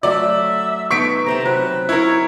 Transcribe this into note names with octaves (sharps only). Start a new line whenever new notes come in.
F#3 A3 D5 E5
B3 D#4 A4 C#6 B6 D7
C3 C4 A5 A#5
F#3 B4
E4 A#4 C#5